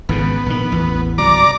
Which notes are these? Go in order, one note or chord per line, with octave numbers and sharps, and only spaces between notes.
G#1 G#2 C#3 B3
A#1 D#3
A1 E2
G1 C2 F#3 D5 A#5 D6